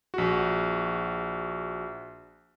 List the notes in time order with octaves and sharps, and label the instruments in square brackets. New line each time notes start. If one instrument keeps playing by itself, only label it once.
[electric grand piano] A#1 F#4